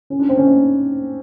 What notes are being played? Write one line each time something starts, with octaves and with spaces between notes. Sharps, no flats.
C#4
D4
C4
C#4
D#4